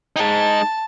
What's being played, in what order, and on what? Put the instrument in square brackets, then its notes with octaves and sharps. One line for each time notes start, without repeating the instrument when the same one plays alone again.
[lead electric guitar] G#3 D#4 [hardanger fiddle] A5